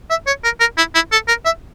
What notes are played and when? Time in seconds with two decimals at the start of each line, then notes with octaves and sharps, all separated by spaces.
0.10 E5
0.27 C#5
0.44 A#4
0.60 A#4
0.78 E4
0.95 E4
1.12 A4
1.28 A#4
1.46 E5